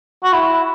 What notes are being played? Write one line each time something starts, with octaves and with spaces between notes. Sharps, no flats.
F#4
E4